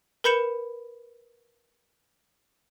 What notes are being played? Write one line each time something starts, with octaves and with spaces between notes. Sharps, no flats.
A#4 B4 B5 G6 C#7 E7